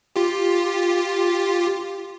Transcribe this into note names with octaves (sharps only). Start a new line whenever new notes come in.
F4 G4